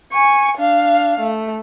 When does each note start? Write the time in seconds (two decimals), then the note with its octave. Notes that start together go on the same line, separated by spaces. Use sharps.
0.13 G#5 C#6
0.58 D4 F5
1.20 A3